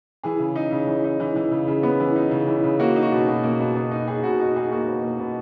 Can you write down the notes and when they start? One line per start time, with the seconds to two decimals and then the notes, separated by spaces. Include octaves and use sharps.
0.24 E3 G#4
0.39 C#3
0.56 D#4
0.72 C#3
0.87 E3
1.04 D#4
1.20 E3
1.36 E3
1.51 C#3
1.68 C#3
1.83 B3
2.00 E3
2.16 D#4
2.31 C#3
2.47 E3
2.63 C#3
2.79 A#3 F#4
2.96 D#4
3.03 F#4
3.12 B2
3.28 B2
3.44 A#3
3.60 B2
3.75 B2
3.91 D#4
4.08 D#4 G#4
4.23 B2 F#4
4.40 D#4 F#4
4.56 D#4 G#4
4.71 A#3 F#4
4.87 B2
5.03 A#3
5.20 B2